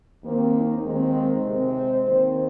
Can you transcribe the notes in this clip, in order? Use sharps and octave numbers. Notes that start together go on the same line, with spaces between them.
D#2 D#3 A#3 C4
D#4
D#2 D#3 G#3 C4
A#4
C3 G#3 C4
C5
D#2 D#3 C4 C5